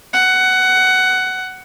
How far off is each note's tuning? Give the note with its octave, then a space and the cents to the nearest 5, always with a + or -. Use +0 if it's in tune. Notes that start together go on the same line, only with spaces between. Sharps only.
F#5 +15